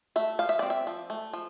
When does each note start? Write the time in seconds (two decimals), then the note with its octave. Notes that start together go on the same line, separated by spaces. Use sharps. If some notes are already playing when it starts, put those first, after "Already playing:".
0.16 A3 E5
0.39 F3 F5
0.49 E5
0.59 C4 D5
0.70 E5
0.87 F3
1.10 A3
1.33 F3